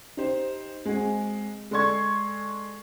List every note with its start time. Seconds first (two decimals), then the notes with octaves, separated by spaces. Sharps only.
0.17 D#4 G4 C5
0.85 G#3 C4 F#4 G#4
1.71 G#3 A4 D5 C6 C#6 G#6